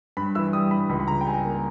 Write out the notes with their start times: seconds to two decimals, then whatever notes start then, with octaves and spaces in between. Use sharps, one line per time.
0.17 G2 B5
0.35 E3 E6
0.53 G3 D#6
0.71 G2 B5
0.89 C#2 B5
1.00 B5
1.08 C#3 A#5
1.21 G5
1.27 G3 G#5
1.45 A#3